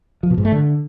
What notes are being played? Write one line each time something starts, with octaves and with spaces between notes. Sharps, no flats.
F3
B2
G#2
A3
D3